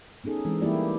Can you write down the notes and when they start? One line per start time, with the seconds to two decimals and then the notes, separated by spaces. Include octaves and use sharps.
0.24 B3 C#4 D#4 G#4 A4
0.45 E3 G#3 C4
0.62 E3 G3 A#3 E4 G4 D5